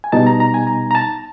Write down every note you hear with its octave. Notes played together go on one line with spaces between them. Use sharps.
G#5
B2 G3 B3 D#4 A5
A#5
A#5
G#5
A#5
A#5
A5